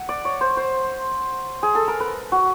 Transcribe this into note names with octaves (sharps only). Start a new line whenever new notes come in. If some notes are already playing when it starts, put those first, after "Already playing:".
Already playing: F#5
D5
C#5
C5
C5
G#4
A4
A#4
B4
F#4